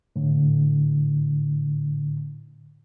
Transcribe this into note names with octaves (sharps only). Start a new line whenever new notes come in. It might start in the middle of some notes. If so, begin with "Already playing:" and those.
A2 D3